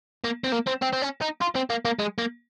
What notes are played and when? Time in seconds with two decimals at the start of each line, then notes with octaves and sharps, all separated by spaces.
0.24 A#3
0.44 C4
0.52 A#3
0.67 C4
0.82 C4
0.93 C4
1.02 C#4
1.21 D#4
1.41 F4
1.55 C4
1.70 A#3
1.85 A#3
1.99 G#3
2.18 A#3